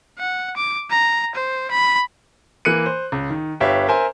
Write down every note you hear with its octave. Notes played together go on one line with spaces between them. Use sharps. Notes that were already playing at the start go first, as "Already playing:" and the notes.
F#5
D6
A#5
C5
B5
E3 A#3 F#6 C#7 D#7
C5
C#2
D#3
G1 G4 B4 C#5 E5 F5
A#4 C5 E5 G#5